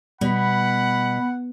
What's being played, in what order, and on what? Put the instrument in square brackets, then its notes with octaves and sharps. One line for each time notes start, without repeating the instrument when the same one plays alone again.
[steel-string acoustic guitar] B2 [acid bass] G3 [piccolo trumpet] F#5 [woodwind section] B5